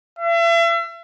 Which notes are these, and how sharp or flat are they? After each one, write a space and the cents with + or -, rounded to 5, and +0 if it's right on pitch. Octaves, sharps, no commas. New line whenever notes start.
E5 +40